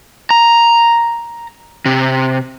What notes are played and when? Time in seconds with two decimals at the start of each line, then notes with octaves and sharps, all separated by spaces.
0.31 A#5
1.86 C3